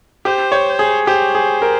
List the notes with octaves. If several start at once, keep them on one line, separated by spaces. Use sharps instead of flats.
G4 C5
C#5
G#4
G4 C5
G#4
A#4